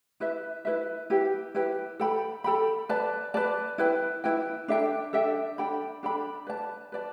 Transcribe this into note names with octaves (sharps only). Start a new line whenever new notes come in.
E4 B4 E5
E4 B4 E5
E4 G4 B4 G5
E4 G4 B4 G5
A4 G5 B5
A4 G5 B5
B4 D5 A5
B4 D5 A5
E4 B4 G5
E4 B4 G5
D4 A4 E5 G5
D4 A4 E5 G5
D4 A4 G5 B5
D4 A4 G5 B5
B4 D5 A5
B4 D5 A5